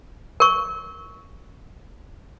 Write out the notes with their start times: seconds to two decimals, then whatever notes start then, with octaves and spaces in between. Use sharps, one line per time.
0.40 A#4 C#6